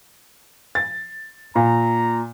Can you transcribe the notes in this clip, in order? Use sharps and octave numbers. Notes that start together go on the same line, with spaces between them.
A6
A#2 A#5